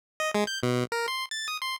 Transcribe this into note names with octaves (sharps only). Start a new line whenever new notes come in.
D#5
G#3
G6
B2
A#4
C6
A6
D#6
C6